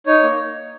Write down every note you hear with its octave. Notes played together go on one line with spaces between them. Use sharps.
D#4 C#5
A#3